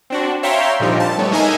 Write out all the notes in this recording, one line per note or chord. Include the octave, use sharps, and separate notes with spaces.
C4 D4 F#4
C#5 E5 F5 G5 A#5 C6
A#2 D3 F3 G3 C4 D#4
A5
G3 A3 B3 C#5
G#3 A#3 D#4 D#5 E5 G#5